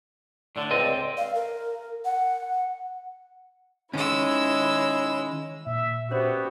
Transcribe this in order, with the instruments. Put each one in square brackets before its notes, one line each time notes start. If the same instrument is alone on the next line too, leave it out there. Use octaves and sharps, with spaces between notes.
[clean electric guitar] A2 D3 [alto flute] D5
[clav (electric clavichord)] C#2 D#5 [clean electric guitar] C4
[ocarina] F5
A#4
F#5
[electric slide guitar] D#3 C#4 [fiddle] G#3 E6 [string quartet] E4 C#5
[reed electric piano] A#2 [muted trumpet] E5
[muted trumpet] B3 [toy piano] C#4 C5 D5 [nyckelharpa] F#4 G4